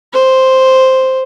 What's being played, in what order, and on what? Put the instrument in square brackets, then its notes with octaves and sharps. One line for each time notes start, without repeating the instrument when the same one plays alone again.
[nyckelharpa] C5